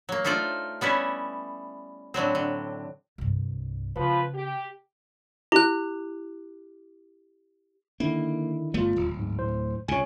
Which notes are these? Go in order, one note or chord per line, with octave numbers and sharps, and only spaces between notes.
F#3 A#3
A3 D#4 F4 C5 D5
G3 B3 C#4 E4
A2 D3 F#3 C4
D3
C2 G2
C#3 F3 B4 C5
G4
E4 G4 F#6
D3 D#3 A#3 E4
G1 G3 A3 B3 F4
D1
G#2
A2 C5
C#2 C3 C#5 G#5